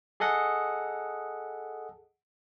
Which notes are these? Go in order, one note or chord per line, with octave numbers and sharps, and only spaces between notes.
G#4 A4 D#5 F#5